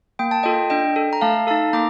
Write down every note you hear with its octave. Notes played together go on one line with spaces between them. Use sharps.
A#3 G5
A5
F4 A4 D#5 G5
D4 D#5 G5
A4
A#5
A3 F5 A5
D#4 A4 F5 A5
A#3 A#5 D6